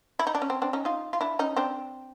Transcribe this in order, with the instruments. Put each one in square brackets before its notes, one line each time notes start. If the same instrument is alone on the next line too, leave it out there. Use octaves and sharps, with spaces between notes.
[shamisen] E4
D#4
D4
C#4
C4
C4 D4
C#4 D#4
D#4 F4
F4
D4 E4
C#4 D#4
C4 D4